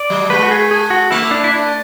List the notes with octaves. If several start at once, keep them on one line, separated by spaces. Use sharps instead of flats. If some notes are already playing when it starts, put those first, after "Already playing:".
Already playing: D5
F#3
G#3 B4
F#4
G#4
G#4
F#4
A3 E4
D4
E4
D4